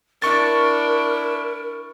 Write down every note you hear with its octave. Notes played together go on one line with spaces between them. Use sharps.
D4 E4 A#4 C#6 A6